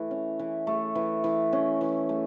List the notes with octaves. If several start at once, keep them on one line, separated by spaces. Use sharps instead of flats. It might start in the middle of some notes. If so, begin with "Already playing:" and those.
Already playing: E3 A3
C#4
E3
A3
E3
E3
C#4
E3
A3